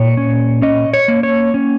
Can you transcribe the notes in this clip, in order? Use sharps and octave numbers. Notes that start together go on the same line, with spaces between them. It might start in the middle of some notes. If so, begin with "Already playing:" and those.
Already playing: A#2 C#5
C#4
C#4 D#5
C#5
A#3
C#5
C#4